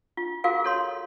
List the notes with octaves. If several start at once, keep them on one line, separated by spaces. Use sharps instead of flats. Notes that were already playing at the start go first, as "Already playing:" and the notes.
F4
F4 F#4 G#4 A#4 F5
A4 C#5 C6